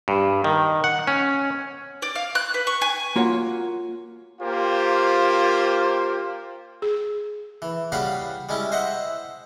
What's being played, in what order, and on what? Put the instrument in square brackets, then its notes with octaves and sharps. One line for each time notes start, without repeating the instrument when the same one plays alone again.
[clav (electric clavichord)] G2
D#3
F#5
C#4
[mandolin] D5
F5
F#6
B4
C#6
G#5
[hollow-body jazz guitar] A#3 F4 F#4 C#5 F#5
[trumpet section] A#3 F4 G4 C5
[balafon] G#4
[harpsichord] E3
C#3 G3 F#4 F5 B5
G3 G#3 C#4 E4
C5 D#5 E5 F#5